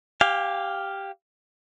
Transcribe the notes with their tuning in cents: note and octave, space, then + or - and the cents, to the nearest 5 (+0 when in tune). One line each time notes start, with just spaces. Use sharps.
G4 +0 F5 +0 G#5 -35